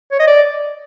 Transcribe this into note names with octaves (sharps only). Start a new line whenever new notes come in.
C#5
D#5
D5